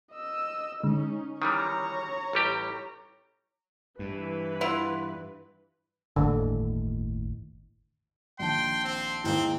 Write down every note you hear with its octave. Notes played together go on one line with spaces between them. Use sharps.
D#5 E6
D3 G#3 C#4 D#4
D#3 E3 G3 C#5 A#5
A1 G3 G4
G2 E3 B4
B3 E4 F4
G1 D#2 A2 D3
A#1 D#3 G5 A5 C6
C4
D#2 G#2 A#3 C4 E4 G5 G7